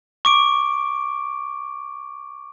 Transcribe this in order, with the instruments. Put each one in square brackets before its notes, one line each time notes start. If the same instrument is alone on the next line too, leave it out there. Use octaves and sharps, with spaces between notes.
[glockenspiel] C#6 D6 D7